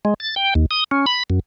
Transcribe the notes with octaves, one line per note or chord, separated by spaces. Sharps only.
G#3
A6
G5
D#2
D#6
C#4
B5
F#2